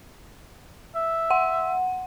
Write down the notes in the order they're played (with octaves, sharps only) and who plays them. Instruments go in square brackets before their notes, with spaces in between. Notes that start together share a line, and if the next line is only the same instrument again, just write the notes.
[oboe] E5
[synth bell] F#5